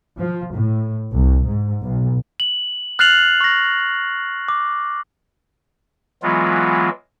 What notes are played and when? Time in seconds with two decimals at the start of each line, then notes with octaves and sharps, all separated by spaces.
0.18 F3
0.53 A2
1.11 C2
1.45 G#2
1.82 B1
2.40 F#7
2.99 F6 F#6 A6 C7 F7 F#7
3.41 C#6 A#6
4.48 D6
6.23 E3 F#3 G#3 B3 F4